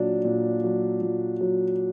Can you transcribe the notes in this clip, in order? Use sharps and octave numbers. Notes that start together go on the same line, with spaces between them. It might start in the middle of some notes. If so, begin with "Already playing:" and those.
Already playing: A#2 F#3 D4
A#2
F#3
A#2
F#3